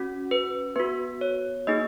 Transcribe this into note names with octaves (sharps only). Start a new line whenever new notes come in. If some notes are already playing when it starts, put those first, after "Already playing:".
Already playing: C#4 F#4
B4
B3 F#4 B4
C#5
A#3 D#4 G#4 D#5